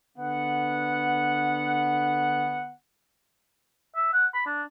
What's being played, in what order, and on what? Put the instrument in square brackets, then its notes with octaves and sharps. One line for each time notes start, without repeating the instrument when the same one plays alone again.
[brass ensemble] D3 B3 F#5
[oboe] E5
F#5
B5
D4